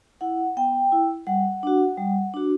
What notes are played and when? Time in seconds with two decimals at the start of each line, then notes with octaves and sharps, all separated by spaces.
0.21 E4 F#5
0.57 B3 G5
0.92 E4
1.27 G3 F#5
1.63 D4 F#4
1.97 G3
2.34 D4 F#4